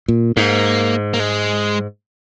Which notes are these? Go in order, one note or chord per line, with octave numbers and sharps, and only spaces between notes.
A#2
G#2 A#3
A#3
G#3